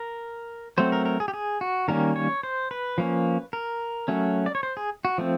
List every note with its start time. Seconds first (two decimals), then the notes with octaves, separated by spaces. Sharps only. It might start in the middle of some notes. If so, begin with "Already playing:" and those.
Already playing: A#4
0.78 F#3 A3 C4 C5
0.92 A#4
1.05 A#4
1.20 G#4
1.28 G4
1.34 G#4
1.61 F#4
1.88 D#3 G3 A#3 C#4 A#4
2.16 C#5
2.43 C5
2.71 B4
2.98 F3 A#3 C#4
3.53 A#4
4.08 F#3 A3 C#4
4.46 D5
4.55 C#5
4.63 C5
4.77 G#4
5.05 F#4
5.18 F3 A3 C4